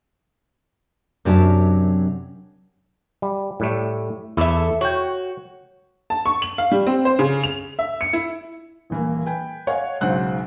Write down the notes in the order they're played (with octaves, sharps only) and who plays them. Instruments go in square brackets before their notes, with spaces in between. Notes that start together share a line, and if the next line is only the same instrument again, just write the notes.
[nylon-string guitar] F#2 C3 F#3 D4 A#4 A5
[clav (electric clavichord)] G3
A2 G3 A3
[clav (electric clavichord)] E2 E4 [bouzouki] A4 E5
[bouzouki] F#4 [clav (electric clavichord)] C#5 G5
[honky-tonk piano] A5
C#6
F#7
F5
G3
C4
C5
C#3
F7
E5
C#7
E4
[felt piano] D#1 E3 A#3
B4 G5 G#5
C#5 D#5 F5 F#5 G#5
B1 G#2 C#3 C5 F#5 F#6